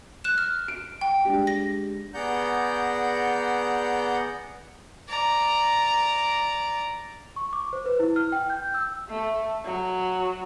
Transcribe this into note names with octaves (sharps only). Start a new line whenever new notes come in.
F#6 E7
F6
D7
G5
G#3 D4 G4
A#6
B3 G#4 D5 F#5 A#5 G6
D5 A#5
C#6
D6
C5
B4
E4
F6
G5
G6
E6
A3
F#3